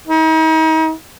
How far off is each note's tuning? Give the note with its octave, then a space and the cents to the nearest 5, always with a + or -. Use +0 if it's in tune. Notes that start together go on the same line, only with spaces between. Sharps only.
D#4 +40